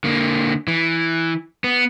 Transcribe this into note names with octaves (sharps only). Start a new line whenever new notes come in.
D3 A#3
E3
B3